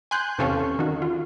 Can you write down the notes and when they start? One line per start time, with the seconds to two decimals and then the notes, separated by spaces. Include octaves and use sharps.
0.11 G#5 C6 F#6 G6
0.38 E2 C3 C#4 A4 F5 C#6
0.79 D#3 F#4
1.02 F4